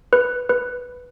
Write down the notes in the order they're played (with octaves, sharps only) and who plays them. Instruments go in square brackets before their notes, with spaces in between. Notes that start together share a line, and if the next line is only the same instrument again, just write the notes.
[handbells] B4
B4